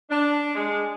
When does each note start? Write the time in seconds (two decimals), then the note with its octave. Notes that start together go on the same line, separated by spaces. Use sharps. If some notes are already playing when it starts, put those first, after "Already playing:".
0.10 D4
0.55 G#3